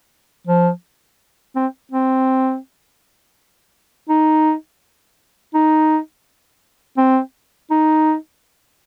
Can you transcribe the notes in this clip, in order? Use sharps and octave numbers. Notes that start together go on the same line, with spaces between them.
F3
C4
C4
D#4
D#4
C4
D#4